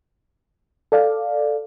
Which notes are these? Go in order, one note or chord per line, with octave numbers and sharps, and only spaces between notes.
A4 D5 F5